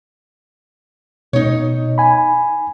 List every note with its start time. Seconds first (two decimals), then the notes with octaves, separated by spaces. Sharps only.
1.33 B2 D#4 C#5
1.98 G#5 B5